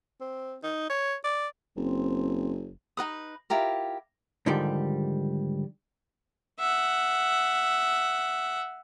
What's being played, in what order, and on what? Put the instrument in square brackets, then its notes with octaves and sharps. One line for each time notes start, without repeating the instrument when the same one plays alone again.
[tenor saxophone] C4
D#4
C#5
D5
[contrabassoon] F#1 [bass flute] C4
[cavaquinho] D#4 F#4 B4 D#6
E4 F4 G4 A#4
[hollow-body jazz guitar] G#2 D3 D#3 F3 G3 G4
[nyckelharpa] E5 F#5